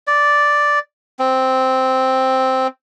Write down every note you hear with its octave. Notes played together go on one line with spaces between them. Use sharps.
D5
C4